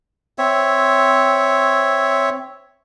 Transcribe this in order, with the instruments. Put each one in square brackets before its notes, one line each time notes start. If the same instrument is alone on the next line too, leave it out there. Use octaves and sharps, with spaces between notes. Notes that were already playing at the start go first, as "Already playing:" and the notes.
[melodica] C4 C#5 E5